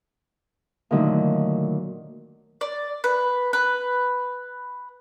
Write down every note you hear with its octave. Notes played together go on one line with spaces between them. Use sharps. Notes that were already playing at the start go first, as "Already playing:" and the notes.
A#2 D3 D#3 F#3 A3
D5
B4
B4